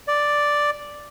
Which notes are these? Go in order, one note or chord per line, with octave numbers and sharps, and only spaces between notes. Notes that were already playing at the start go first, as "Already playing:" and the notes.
D5